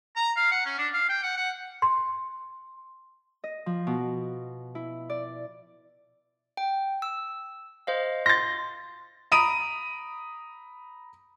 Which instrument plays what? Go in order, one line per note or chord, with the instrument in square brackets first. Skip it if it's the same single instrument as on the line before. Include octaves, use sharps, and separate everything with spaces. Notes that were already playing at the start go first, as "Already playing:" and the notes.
[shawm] A#5
F5
F#5
C#4
D4
F5
G5
F#5
F#5
[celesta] C6
[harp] D#5
F3
B2
E4
D5
[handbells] G5
E6
C5 D#5 F5
[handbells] C6 [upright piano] A6 A#6
[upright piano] A#5 B5 D#6 D7 D#7